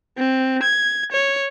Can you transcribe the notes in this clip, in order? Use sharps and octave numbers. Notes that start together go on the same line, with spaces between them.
C4
G#6
C#5